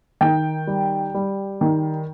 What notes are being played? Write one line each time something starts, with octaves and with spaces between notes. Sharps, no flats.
D#3 G5
G3
G3
D#3